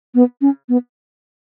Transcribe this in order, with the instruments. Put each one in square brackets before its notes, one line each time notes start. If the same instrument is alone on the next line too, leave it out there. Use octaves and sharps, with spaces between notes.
[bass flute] B3
C#4
B3